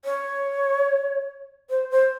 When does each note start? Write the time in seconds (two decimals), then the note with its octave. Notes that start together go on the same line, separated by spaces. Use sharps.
0.05 C#5
1.70 C5
1.91 C5